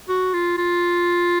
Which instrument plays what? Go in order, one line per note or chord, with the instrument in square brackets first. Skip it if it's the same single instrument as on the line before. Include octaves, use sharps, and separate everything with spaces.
[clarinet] F#4
F4
F4